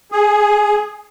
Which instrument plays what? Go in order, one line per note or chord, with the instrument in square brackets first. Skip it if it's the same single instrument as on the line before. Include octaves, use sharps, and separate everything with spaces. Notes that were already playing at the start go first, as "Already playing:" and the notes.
[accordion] G#4